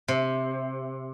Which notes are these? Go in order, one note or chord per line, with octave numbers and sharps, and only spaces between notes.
C3